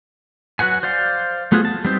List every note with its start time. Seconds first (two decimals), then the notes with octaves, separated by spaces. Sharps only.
0.59 F#3 F#4 B4 F#5 G#5
0.83 C5 D5 F5 C6
1.52 A3 B3 F4 F#4 G#4
1.65 A5
1.85 G3 B3 C4 D#4 C5